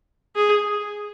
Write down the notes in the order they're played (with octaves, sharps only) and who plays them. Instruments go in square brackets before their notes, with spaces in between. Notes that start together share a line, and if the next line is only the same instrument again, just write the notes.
[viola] G#4